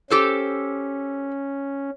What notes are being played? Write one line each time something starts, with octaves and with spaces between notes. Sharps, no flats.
C#4 G4 A4 C5